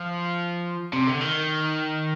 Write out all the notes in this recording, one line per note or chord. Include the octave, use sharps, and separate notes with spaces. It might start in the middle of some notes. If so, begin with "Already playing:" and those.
Already playing: F3
C3
D3
D#3